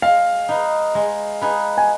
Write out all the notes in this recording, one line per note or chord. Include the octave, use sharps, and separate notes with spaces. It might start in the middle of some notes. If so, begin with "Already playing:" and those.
G#3 F5
D#4 G#4 B4
G#3
D#4 G#4 B4
G#5